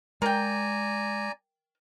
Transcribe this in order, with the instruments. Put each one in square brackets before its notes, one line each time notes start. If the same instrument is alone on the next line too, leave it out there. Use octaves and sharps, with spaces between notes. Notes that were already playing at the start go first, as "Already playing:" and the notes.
[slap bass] G#3 [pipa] A#4 G5 [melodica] D5 G#5 A#5